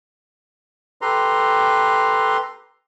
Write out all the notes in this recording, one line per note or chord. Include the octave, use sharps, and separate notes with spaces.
G4 A4 B4 A#5 C6